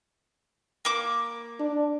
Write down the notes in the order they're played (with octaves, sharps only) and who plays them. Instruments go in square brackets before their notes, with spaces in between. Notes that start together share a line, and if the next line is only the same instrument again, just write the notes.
[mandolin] A#3 D6
[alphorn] D4